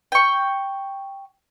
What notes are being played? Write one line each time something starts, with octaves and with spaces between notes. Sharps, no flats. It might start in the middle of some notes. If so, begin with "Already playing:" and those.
G5 C#6